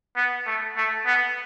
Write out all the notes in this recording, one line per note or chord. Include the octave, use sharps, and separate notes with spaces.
B3
A3
A3
B3